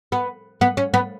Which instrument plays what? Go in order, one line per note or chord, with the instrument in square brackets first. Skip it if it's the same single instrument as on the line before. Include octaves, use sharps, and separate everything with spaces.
[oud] B3
B3
C#4
B3